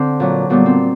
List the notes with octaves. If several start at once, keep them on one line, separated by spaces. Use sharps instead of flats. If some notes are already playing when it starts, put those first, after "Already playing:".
Already playing: D3 C4
A#2 F#3
A#2 G3 B3
C4